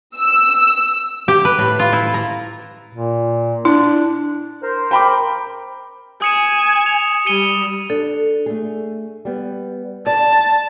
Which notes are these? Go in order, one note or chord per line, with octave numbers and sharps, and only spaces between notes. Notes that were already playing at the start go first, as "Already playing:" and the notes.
E6
G4
B4
A2
F4
E4
A#5
A#2
D4 E4
A#4 C5
G5 B5 D6
G#5 D#6 C#7 E7
F7
G3 C#7 D#7 G7
D4 A4
A3 G#4
G3 B3
D5 A5